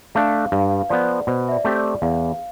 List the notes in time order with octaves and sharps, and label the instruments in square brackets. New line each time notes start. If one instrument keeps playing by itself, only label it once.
[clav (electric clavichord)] A3 D4 A4 [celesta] F5
[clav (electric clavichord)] G2 [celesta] F5
[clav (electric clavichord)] F3 B3 [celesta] D5
[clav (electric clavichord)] B2 [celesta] C5
[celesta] E5
D5
[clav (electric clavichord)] A3 C4 G4
[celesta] D5
[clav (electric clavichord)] E2 [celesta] F5